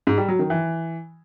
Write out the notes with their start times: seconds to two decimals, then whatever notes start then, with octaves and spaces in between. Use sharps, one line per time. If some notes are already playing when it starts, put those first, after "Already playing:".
0.07 G#2
0.18 G3
0.28 F#3
0.39 D#3
0.50 E3